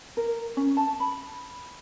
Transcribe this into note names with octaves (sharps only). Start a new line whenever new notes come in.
A#4
C#4
A5
B5